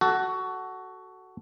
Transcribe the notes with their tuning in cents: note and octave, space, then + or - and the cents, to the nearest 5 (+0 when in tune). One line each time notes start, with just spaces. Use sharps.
F#4 +15 A4 +0